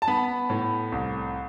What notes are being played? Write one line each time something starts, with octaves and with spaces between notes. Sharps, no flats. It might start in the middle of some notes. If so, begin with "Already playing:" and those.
A5
B3 B5
A2
C2